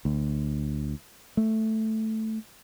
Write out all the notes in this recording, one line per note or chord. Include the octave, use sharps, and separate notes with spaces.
D2
A3